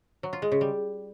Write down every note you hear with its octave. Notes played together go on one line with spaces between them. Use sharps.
F#3
F4
G#3
C#3
G3